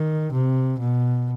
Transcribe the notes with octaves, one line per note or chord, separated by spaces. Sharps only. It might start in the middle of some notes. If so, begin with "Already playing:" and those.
Already playing: D#3
C3
B2